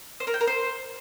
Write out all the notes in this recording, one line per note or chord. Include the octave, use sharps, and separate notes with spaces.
C5
A#4
G5
A#4
C5